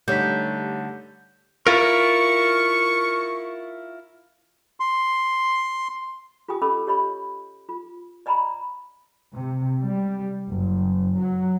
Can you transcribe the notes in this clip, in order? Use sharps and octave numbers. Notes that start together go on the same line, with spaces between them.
D3 G3 A3 D#4 G4 C#5 G6 B6
E4 F4 A#4 C#6
C6
F4 G4 G5 G#5 D#6
C#4 A4 D#5 B5 D6 E6
G4 C#5 D#5 B5
F4
D5 D#5 G#5 A#5 B5
C3
G3
F#1
F#3